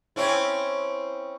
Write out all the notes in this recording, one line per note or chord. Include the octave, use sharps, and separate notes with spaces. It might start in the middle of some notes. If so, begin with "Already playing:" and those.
C4 C#4 E4